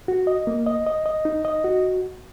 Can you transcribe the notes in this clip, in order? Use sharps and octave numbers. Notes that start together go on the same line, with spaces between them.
F#4
D#5
A#3
D#5
D#5
D#5
D#4
D#5
F#4